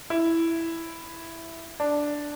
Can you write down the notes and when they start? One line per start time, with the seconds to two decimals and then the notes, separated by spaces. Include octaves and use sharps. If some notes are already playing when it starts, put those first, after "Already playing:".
0.10 E4
1.80 D4